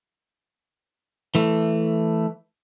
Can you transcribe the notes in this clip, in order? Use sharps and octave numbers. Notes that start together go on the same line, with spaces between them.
E3 A3